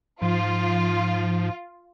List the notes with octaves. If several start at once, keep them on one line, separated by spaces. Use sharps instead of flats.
G#2 F3 F4